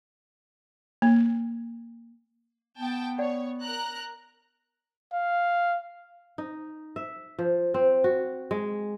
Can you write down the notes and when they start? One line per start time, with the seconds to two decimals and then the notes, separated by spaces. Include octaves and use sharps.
1.02 A#3
2.78 B3 G5 A5
3.18 C#5 D5 F#5 G5
3.61 A#4 A#5 F#6
5.13 F5
6.38 D#4
6.96 E5
7.39 F3
7.74 C4
8.04 F#4
8.51 G#3